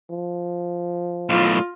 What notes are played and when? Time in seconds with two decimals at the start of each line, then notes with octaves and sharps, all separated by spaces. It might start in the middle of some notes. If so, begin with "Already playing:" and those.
0.10 F3
1.29 B1 A2 F4